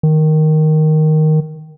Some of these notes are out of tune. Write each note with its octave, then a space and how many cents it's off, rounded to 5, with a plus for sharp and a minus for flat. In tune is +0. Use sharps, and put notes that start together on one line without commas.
D#3 +0